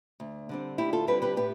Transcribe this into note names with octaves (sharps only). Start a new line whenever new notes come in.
D2
D3 G3 C4
D2 E4 G4
F4 A4
D3 G3 C4 G4 B4
G4 B4
A2 G4 B4